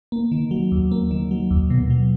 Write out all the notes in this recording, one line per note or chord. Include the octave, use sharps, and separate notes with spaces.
A#3
D#3
F#3
D#2
A#3
D#3
F#3
D#2
B2
F#3